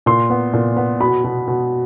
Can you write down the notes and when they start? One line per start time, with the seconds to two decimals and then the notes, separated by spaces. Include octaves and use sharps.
0.06 A#2 C6
0.30 B3
0.54 A#2
0.76 B3
1.00 B2 B5
1.24 B2
1.48 B2